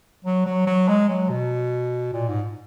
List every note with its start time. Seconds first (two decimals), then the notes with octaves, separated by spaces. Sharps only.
0.25 F#3
0.46 F#3
0.66 F#3
0.89 G#3
1.09 F#3
1.30 B2
2.13 A#2
2.28 G#2